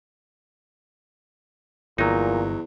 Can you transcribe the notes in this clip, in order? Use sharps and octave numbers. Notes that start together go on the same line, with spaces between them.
G1 E2 A#2 F#3 D#4